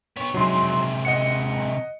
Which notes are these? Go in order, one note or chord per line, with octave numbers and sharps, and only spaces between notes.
B3 C#5
C3 F#3 G#3 D#4 C6
D#5 F#5 C#7